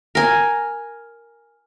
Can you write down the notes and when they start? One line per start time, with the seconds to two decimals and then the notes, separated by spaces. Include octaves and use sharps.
0.15 A#4 G#5